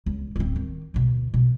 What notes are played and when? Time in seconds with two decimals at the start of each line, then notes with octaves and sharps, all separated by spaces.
0.06 C#2
0.36 D1 C4
0.56 D#3
0.94 D2 B2
1.34 B2